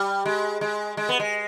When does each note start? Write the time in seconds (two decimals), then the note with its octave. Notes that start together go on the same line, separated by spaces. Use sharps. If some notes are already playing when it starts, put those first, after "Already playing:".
Already playing: G3
0.26 G#3
0.61 G#3
0.97 G#3
1.09 B3
1.20 G#3